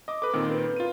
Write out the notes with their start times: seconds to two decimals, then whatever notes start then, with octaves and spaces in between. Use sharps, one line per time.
0.08 D#5 D6
0.22 A4 B4 D6
0.33 A#2 D#3 C4
0.49 C#4 A#4 B4
0.76 F4 D#7